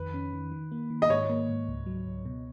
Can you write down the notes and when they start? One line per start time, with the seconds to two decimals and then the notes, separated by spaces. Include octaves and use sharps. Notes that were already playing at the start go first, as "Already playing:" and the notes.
Already playing: F2 D#3 B4
0.14 C#4
0.33 D#3
0.52 D#3
0.72 A#3
0.90 D#3
1.02 D#5
1.09 G#2 C#5
1.30 A#3
1.49 G#2
1.68 C#2
1.86 F#3
2.06 C#2
2.25 B2